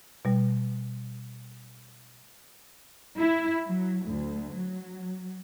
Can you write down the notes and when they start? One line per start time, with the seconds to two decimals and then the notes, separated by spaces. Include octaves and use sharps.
0.25 B2 G3
3.18 E4
3.67 F#3
4.05 D2
4.54 F#3